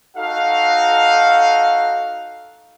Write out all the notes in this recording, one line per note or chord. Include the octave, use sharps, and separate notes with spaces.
D#4 F#4 A4 F5